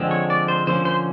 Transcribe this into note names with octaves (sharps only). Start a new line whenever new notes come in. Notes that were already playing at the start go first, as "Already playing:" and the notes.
Already playing: D3 F3 G#3 C4
C#5
D5
C5
D3 F3 A#3 C#4 C5
C5